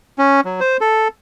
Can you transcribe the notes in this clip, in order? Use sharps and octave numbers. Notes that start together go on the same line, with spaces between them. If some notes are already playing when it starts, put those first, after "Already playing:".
C#4
F#3
C5
A4